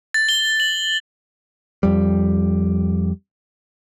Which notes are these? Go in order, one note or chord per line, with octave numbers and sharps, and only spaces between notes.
A6
G7
F#7
F2 G3